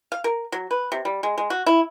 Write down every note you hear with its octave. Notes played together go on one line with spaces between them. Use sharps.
F5
A#4
F#3
B4
C3
G3
G#3
G#3
F#4
E4